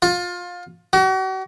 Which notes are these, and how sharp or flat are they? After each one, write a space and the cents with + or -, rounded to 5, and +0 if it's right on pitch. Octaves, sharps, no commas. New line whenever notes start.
F4 +25
F#4 +40